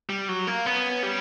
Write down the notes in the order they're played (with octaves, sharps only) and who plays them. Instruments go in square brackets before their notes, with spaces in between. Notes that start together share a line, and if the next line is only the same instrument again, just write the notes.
[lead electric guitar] G3
F#3
A#3
[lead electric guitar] B3 [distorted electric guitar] C#4
[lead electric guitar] G3